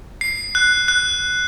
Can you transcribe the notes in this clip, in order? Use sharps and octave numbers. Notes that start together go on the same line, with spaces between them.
C7
F#6
F#6